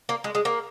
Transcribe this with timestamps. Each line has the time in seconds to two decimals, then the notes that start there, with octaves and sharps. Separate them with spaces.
0.09 A#3
0.24 G#3
0.35 G#3
0.45 A#3